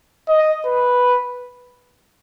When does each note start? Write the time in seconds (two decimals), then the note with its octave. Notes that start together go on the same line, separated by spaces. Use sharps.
0.29 D#5
0.66 B4